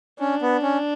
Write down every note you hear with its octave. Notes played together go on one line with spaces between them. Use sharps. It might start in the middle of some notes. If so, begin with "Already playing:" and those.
C#4 D4
B3
C#4